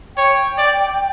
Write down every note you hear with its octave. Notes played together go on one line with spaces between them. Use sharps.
C#5 G5
D5